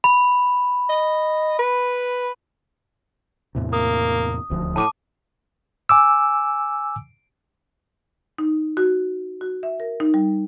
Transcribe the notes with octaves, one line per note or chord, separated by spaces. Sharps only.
B5
D#5
B4
E2 A2 C3
A#3 D#6
D#1 D2 F3
A2 A5 D6 D#7
G#5 D6 E6
D#4
F#4
F#4
E5
A#4
D#4
G3